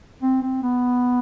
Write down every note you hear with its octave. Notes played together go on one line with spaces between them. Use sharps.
C4
C4
B3